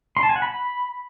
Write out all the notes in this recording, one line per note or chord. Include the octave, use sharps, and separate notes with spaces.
C6
A5
G#5
F#5
B5